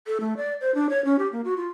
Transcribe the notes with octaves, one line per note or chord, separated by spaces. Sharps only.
A4
A3
D5
C5
D4
C#5
C#4
G4
A#3
F#4
F4